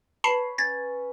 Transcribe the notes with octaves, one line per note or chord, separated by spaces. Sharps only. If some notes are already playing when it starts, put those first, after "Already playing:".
B4 C#5 A5 B5 C7
C#4 G#6 A6